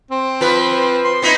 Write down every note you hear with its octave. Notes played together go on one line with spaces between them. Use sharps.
C4
F3 B4
C6
B3 D#4 E4